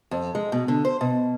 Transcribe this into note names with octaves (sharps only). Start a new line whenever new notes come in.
F2
G#3
B2
D3
C5
B2